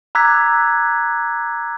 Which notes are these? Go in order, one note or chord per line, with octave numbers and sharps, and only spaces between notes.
A#5 D6 E6 F#6 G#6 B6